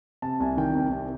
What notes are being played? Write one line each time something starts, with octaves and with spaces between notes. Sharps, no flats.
C3 A5
C2 G#5
D#3 G5
C2
C3